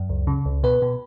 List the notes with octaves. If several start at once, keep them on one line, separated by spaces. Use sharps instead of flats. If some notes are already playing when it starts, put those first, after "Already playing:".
Already playing: F#2
C#2
C#3
C#2
B2 B4
B2